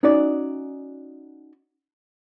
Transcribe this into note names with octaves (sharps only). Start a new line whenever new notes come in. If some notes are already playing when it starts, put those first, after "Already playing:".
C#4 D#4 F#4 C#5 D5